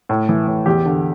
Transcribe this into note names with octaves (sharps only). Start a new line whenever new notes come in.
A2
E3
A2
E2 G4
D3